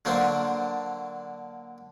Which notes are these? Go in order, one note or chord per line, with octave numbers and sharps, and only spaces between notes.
D3 F#3 A#3 D4 C5